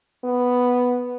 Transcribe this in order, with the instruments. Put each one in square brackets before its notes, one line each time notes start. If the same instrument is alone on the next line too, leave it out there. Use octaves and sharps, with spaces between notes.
[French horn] B3